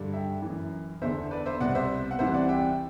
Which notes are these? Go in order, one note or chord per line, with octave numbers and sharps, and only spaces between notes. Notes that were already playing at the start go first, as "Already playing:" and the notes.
Already playing: G2 D3
E5 G5
F#2 E3
E2 D3 C5 E5
B4 D5
C5 E5
C2 B2 D5 F#5
C5 E5
F#5
C2 C3 E3 C5 E5
D5 F#5
E5 G5